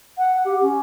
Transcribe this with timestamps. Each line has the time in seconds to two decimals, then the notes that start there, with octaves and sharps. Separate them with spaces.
0.18 F#5
0.44 G4
0.61 C#4